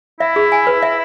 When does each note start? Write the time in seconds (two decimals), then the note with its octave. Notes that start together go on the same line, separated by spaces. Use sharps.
0.20 E4 E5
0.36 G#4
0.52 G#5
0.67 B4
0.83 E5